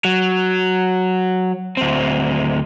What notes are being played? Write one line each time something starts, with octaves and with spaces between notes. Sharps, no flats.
F#3
D2 C4